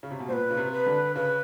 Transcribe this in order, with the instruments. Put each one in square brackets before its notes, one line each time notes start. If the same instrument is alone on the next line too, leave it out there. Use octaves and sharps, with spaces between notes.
[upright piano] C#3
C3
B2
[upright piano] A#2 [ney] B4 C5
[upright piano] C#3
C3
[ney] B4
[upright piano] D3
[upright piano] C#3 [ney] B4